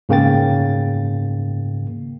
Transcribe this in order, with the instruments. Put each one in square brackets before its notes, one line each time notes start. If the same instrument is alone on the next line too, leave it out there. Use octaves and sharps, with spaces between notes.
[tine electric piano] G#2 C#3 A#3 G5 A6